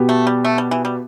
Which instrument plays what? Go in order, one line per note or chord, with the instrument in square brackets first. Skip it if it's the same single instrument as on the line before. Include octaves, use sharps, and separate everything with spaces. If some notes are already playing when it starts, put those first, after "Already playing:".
Already playing: [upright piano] B2 B3 G4
[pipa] A3
G3
A3
G3
E3
G3